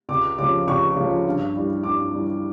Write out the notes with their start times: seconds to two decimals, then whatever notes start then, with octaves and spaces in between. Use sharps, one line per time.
0.09 C#2 D6
0.38 C#3 F3 D6
0.67 C#2 C#6
0.96 C#3 F3
1.26 G2
1.55 E3 G3
1.84 G2 D6
2.13 E3 G3